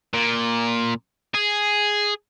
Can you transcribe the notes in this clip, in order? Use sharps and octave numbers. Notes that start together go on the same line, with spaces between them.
A#2
G#4